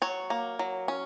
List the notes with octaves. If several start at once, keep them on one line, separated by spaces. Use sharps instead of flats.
F#3 C#5
A#3
F#3
C#4